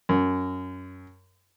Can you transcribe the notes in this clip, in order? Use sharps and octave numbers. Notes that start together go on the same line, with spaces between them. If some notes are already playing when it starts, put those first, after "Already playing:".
F#2